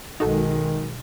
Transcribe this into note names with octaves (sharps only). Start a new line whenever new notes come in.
B1 D#3 G#3 D#4 F#4 A4